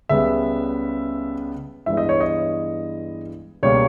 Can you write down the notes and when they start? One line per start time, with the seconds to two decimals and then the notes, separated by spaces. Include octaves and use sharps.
0.09 C#2 C#3 G3 B3 E5
1.86 G2 E3 G#3 B3 E5
1.97 D#5
2.09 C#5
2.20 D#5
3.63 C#2 B2 G3 A#3 C#5